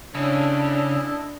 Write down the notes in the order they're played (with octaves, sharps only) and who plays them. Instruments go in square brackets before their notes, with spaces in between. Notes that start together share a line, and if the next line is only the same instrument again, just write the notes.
[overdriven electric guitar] C#3 C#4 [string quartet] D4 [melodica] E4 A4 D#5